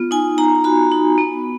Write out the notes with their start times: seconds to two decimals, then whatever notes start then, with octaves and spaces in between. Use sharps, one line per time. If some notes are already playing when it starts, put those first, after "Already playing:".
Already playing: B3 F4
0.11 D#4 G#5
0.38 D#4 A#5
0.64 F#4 B5
0.92 D#4
1.18 B3